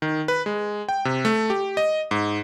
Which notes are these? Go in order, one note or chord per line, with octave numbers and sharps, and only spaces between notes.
D#3
B4
G#3
G5
C3
A3
G4
D#5
G#2